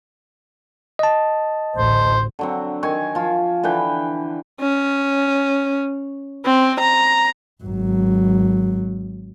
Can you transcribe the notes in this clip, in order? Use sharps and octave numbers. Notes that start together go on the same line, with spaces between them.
D#5 A5
A1 D2 C5
D3 F#3 C4
D#3 G#5 C#6
F3 F4
D3 E3 B4 G5
C#4
C4
A#5
G#1 F#3